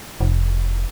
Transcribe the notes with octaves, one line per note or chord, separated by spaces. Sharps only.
F1